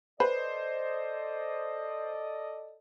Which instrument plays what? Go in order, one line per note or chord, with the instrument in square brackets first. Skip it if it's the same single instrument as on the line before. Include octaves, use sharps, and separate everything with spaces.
[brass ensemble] A4 D5 D#5 [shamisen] B4 [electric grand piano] C5